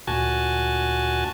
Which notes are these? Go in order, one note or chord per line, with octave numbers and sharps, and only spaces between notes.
D2 A#2 F#4 G#5 A5